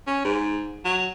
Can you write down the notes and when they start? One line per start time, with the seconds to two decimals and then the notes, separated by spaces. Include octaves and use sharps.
0.07 C#4
0.25 G#2
0.85 F#3